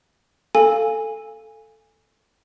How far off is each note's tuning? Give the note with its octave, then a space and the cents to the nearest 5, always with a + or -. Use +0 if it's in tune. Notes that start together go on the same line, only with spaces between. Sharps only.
A4 +0 F5 +0 G#5 -15